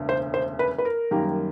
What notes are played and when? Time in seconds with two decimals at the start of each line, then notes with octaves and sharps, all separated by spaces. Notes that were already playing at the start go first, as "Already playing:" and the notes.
Already playing: E1 D2 C#3
0.09 C5
0.34 C5
0.59 B4
0.78 B4
0.85 A#4
1.11 F#2 D#3 G3 A#3